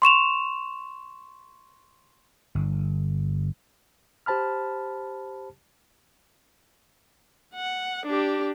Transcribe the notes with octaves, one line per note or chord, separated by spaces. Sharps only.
C6 C#6 E7 F7
G1
G4 C5 A5 B5 F6
F#5
D4 G4